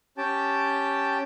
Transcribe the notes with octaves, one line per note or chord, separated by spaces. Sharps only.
C#4 G4 G5 A5